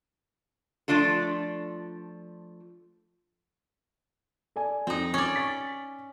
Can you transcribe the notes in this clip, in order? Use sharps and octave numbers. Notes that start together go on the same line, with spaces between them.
F3 A3 D4 F4 A4
A4 D5 G#5
F2 C4 D#4
C#4 D5
C#6 A6 B6